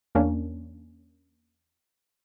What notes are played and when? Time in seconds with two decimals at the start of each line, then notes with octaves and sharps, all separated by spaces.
0.15 E2 A#3 C#4 D4